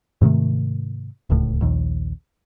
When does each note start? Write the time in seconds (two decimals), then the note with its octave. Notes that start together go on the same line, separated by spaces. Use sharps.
0.21 G#2 C3 D#3 A3
1.30 D1 C#2 A2
1.61 A#1 D#2